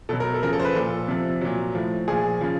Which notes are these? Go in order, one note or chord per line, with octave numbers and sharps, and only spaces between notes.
B2 F#3 A4
A#4
A4
C#3 F3 A#4
A4
C5
B4
A#2 F3 A4
C3 F3
A#2 F#3
A2 F3
A#2 F3 G#4
C#3 F3